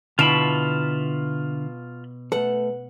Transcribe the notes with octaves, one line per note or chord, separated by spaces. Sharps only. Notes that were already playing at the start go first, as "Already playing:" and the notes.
B2 D3 E4 F4 A5 B5
A3 A4 B4 F#5